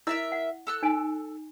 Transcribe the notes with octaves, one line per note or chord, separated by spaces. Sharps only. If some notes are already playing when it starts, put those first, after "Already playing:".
E4 A#4 D#5 E5 E6
F#5
A4 E6 F#6
D#4 G#5